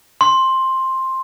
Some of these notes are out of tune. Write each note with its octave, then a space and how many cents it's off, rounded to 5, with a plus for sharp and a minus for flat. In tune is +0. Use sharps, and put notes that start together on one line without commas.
C6 +10